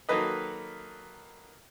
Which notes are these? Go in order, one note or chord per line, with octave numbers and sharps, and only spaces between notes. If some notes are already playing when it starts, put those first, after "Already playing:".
D#3 F#3 A#3 A4 B4 D#5